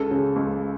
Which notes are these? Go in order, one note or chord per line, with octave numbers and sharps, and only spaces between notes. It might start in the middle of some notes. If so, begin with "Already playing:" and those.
Already playing: C#2 A4
C#3
C#2